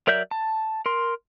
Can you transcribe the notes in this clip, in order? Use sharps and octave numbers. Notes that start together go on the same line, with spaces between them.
F#3 A#4 D5 E5 G6
A5
A#4 C6